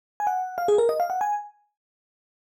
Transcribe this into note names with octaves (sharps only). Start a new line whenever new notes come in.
G#5
F#5
F5
G#4
A#4
D#5
F5
F#5
G#5